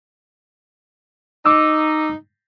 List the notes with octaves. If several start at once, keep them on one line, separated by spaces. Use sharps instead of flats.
D#4 D6 E6